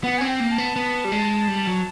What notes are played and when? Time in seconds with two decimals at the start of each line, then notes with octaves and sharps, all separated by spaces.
0.03 B3 F#5
0.18 C4 G#5
0.27 G5
0.40 A#3
0.51 A5
0.58 B3
0.76 B3
1.05 G3
1.12 G#3
1.48 G3
1.67 F#3